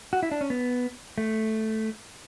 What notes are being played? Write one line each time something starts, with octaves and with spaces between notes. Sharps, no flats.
F#4
E4
D4
C#4
B3
A3